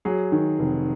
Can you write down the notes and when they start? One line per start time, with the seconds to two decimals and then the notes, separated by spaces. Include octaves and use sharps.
0.05 F#3 G#4
0.32 D#3
0.59 F1